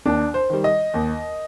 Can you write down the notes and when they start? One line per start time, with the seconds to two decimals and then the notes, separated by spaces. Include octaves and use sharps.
0.06 D#2 D4
0.34 C5
0.50 D#3 G3
0.64 D#5
0.94 D#2